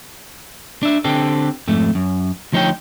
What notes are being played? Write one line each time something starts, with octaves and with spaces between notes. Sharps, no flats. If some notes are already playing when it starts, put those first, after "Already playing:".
D4 E5
D3 C4 G4 A4
F2 G#2 A3
F#2
D2 F3 D#4 G#4 C#5 G5